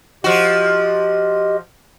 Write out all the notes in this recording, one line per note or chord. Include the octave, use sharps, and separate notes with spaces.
F3 F#4 G4 D#5